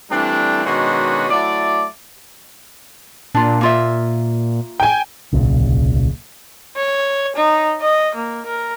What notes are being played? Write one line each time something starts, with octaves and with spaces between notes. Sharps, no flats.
E3 G3 A3 C4 D4
B2 D#3 G#3 C#4 D4 F#4
F#3 A3 E4 D5
A#2 D4 F4
A#3 F4 E5
G5 G#5
D1 B1 A#2 C#3
C#5
D#4
D#5
A#3
A#4